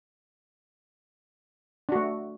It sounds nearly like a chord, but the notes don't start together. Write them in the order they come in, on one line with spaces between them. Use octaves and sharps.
D4 F#4 A3